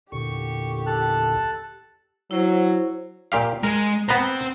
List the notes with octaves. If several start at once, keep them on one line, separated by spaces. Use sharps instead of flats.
E2 A#2 D3 G4 C#6
A4 A5 F#6
F#3 E4 C5
A#2 G4 F5
G#3 A#4
B3 C4 B4 C5 A#5